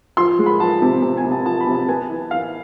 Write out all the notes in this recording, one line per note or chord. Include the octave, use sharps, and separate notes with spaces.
F3 C6
G#3
B5
F3 A5
C3
C3
G#5
C3
A5
F3 A5
B5
C3
A5
B3 G#5
E3
E3 F5